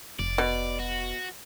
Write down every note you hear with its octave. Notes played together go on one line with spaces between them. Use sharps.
F1 D5
B2
F#4